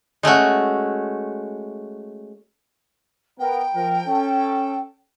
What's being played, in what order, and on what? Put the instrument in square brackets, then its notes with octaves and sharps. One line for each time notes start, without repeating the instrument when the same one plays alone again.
[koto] G#3 A3 C#4 F#4
[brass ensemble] B3 A#4 [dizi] G5
[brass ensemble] F3 A#4
C#4 A4